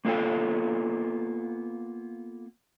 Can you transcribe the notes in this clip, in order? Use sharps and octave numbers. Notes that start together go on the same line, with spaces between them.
A#3 B3 F4 A4 G5